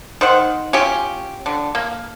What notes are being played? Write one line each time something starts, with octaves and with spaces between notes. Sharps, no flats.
D#3 C5 F#5
C#4 F4 G4
D3
A#3